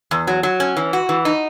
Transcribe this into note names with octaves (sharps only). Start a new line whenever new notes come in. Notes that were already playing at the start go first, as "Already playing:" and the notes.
E2
F#3
F#3
C#4
E3
F#4
E3
D#4